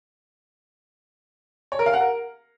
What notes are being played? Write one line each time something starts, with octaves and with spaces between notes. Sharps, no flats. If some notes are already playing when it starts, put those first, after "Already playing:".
C#5
A#4
F5
F#5
A#4